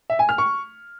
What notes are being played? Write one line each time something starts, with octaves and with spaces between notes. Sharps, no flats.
E5
G#5
F6
C#6